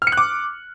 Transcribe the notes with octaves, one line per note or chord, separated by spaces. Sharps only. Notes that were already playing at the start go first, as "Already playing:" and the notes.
F6
C#7
F#6
D6